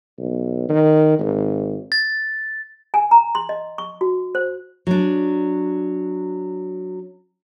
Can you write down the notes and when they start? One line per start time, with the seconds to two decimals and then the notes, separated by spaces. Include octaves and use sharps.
0.19 B1
0.69 D#3
1.19 G#1
1.92 A6
2.94 G#5
3.11 A#5
3.35 C6
3.49 D#5
3.78 C#6
4.01 F#4
4.35 C5
4.87 F#3 D4